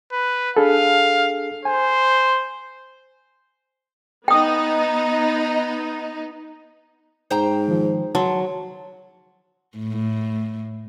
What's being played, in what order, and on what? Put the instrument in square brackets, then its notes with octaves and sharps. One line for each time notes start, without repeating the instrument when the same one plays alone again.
[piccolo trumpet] B4
[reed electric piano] D4 G#4 A4 [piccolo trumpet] F5
[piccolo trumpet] C5 [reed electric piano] G#5
[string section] B3 D#4 [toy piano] G5 D#6
[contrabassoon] G#2 [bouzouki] C5 G5 A#5
[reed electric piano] D#3 F3
[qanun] F#3 [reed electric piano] A5 C6
[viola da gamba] A2